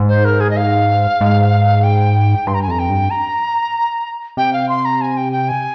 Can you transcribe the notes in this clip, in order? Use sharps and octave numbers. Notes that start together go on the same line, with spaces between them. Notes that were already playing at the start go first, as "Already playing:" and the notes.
Already playing: G#2
C5
A#4
G#4
D#5
F5
G#2
G5
G2 C6
A#5
G#5
F2 A#5
G5
G2
A#5
C3 G5
F5
C6
A#5
G#5
G5
G5
G#5